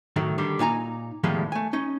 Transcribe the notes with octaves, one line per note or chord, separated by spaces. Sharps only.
A2 D#3 F#3 A3
D3 D#3 G3
A#2 D#4 G#5 A#5
E2 A2 D#3 F3 G3 G#3
A3 G#5
C#4 D#4